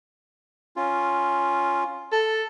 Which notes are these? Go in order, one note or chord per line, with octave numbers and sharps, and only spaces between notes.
C#4 F4
A4